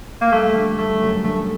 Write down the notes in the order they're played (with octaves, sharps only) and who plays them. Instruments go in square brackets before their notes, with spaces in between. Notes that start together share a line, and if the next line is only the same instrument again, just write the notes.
[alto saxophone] A#3
[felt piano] G3 [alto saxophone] A3
[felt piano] D3
[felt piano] G3 [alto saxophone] A3
[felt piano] F#2
[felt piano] D3 [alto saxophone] A3